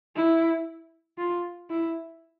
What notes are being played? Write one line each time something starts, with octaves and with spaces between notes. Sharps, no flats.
E4
F4
E4